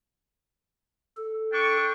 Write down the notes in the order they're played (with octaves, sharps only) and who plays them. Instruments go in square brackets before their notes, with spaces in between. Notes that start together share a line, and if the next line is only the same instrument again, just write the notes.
[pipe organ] A4
[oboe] D4 [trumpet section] G5 C#6